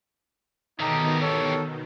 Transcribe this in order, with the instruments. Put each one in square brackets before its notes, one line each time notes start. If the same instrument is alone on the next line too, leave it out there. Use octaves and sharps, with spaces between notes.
[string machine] B2 D#3 [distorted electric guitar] E3 G4 [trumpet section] D#4 A4 A#5
[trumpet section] A4 A#4 C#5